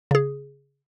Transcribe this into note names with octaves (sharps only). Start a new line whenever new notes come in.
C#3 G#4